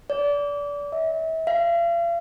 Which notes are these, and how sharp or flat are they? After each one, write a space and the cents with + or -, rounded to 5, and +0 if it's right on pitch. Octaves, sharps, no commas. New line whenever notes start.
D5 -25
E5 -35
F5 -40